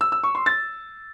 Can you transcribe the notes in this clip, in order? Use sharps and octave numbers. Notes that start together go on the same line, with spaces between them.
E6
E6
C#6
C6
A6